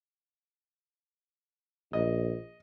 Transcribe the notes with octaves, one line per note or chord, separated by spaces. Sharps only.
A#1 D#5